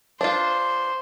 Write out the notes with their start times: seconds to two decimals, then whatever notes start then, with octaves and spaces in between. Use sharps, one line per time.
0.21 D4 F4 C5